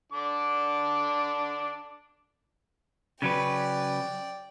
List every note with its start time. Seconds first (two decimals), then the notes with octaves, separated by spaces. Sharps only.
0.12 D3 D4 D6
3.22 C#3 F#3 B4 D5 G5